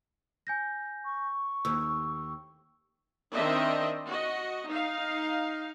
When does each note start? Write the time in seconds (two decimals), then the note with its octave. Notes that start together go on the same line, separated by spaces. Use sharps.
0.47 G#5 G6 A#6
1.05 C#6
1.65 D#2 E6
3.34 D#3 C4 D4 D#5 E5
4.07 F#4 D#5
4.68 D#4 F5